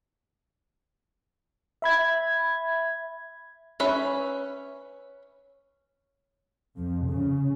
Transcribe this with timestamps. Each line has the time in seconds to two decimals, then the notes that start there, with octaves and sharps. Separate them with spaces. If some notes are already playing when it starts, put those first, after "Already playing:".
1.82 E5 B5 G#6
3.80 C#4 B4 E5
6.77 F2
7.08 C#3